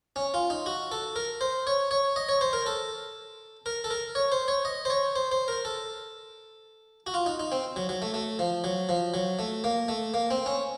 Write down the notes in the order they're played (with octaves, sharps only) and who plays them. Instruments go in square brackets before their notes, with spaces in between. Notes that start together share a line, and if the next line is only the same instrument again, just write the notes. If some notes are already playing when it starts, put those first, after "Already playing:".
[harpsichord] C#4
F4
D#4
F#4
A4
A#4
C5
C#5
C#5
D#5
C#5
C5
A#4
A4
A#4
A4
A#4
C#5
C5
C#5
D#5
C5
C#5
C5
C5
A#4
A4
F#4
F4
D#4
D#4
C4
F#3
F#3
A3
A3
F3
F#3
F3
F#3
A3
A#3
A3
A#3
C4
C#4